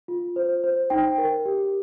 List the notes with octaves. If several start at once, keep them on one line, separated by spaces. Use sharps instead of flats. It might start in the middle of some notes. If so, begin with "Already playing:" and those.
F4
C5
C5
D#4 G5
A#4
G4